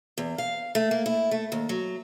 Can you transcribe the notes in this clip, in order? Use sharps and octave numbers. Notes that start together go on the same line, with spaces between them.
E2
F5
A3
A#3
E4
A3
D#2
F#3